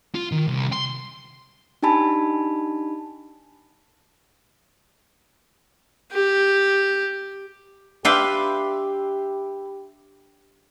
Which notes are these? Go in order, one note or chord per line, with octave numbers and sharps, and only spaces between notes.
F4
D#3
C2
C6
D4 D#4 G4 G#5 A5 B5
G4
D4 G4 B4 E5 F5 G5 C6